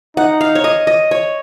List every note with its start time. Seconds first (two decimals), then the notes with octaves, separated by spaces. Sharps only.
0.17 D#4 F#5
0.41 F5
0.55 C#5
0.64 D#5
0.87 D#5
1.11 C#5